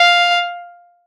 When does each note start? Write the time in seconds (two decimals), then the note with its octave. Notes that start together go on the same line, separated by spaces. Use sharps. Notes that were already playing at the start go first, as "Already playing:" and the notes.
Already playing: F5